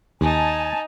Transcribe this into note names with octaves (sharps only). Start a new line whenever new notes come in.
D#2 D#4 G#5 A5